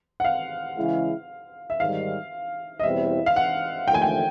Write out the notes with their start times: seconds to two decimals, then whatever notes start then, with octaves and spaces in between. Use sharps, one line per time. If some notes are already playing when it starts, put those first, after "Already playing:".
0.20 F#5
0.25 F5
0.76 C#3 E3 G#3 C#4 E4
1.70 E5
1.80 G#2 D#3 G3 F5
2.80 D#5
2.83 E2 B2 G3 C4 E4 E5
3.26 F5
3.36 F#5
3.87 D#2 D3 F3 A3 G5
3.94 G#5
4.02 G5